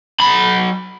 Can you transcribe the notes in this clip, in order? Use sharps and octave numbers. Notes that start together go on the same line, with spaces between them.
F#3 B5